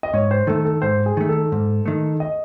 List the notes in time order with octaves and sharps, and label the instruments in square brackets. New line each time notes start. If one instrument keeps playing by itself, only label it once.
[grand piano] D#5
[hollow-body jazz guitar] G#2 [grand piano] C#5
[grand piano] C5
[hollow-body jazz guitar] D#3 A3 [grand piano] A4
[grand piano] A4
[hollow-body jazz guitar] G#2 [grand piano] C5
[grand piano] G#4
[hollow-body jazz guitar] D#3 A3
[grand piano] A4
[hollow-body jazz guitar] G#2
D#3 A3
[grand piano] D#5